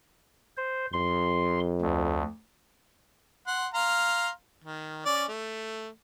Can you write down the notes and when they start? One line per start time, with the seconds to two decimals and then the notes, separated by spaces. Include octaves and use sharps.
0.57 C5
0.93 F2 C6
1.82 D2
3.47 F#5 C6
3.74 F5 A#5 C6
4.64 D#3
5.06 C#4 D5
5.28 A3